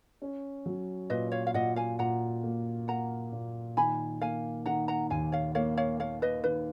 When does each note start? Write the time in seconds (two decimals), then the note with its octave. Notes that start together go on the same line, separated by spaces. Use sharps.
0.22 C#4
0.66 F#3
1.10 A#2 B4 D#5
1.32 C#5 F5
1.47 F5
1.54 A#2 D#5 F#5
1.76 F5 G#5
1.99 A#2 F#5 A#5
2.43 A#3
2.88 A#3 F#5 A#5
3.33 A#2
3.77 D#3 G#5 B5
4.21 A#3 F5 G#5
4.66 D#3 F#5 A#5
4.88 F#5 A#5
5.10 D#2 F5 G#5
5.32 C#5 F5
5.55 A#3 C#5 F5
5.78 C#5 F5
5.99 A#3 C#5 F5
6.22 B4 D#5
6.44 D#3 B4